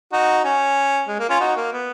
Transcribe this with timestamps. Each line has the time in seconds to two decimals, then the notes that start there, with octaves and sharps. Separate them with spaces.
0.13 D#4 F#4
0.44 C#4
1.08 G#3
1.19 A#3
1.29 C#4 F4
1.40 D#4 F#4
1.57 A#3
1.73 B3